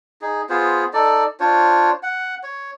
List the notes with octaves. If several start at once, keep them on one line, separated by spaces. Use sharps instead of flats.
D#4 G#4
B3 F4 G#4 C5
D#4 A4 D5
D4 F4 C5 C#5
F#5
C#5